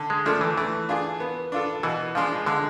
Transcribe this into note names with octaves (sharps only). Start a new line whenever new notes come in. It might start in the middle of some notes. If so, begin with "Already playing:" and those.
Already playing: D3
G#3
F3 A3 D4 A4
E3
E3 A3
D4 F4 G#4
B3
D4 F4 A4
B2 E3
F3 G#3 D4 F4
D3 G#3